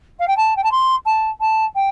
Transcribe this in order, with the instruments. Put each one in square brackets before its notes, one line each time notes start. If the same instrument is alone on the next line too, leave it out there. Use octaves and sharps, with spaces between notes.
[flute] F5
G5
A5
G5
A5
C6
A5
A5
G5